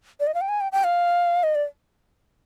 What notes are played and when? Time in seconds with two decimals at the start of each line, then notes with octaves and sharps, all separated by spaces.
0.20 D5
0.27 D#5
0.34 F5
0.41 G5
0.49 G#5
0.61 G5
0.72 G5
0.84 F5
1.43 D#5
1.55 D5